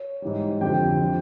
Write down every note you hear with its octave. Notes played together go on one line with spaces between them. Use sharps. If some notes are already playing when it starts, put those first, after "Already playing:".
Already playing: C#5
G#2 E3 G3
F2 D3 F3 G4 G5
D3 F3